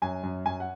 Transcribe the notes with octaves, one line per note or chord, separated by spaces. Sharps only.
F#2 G#5
F#2
F#2 G#5
F#5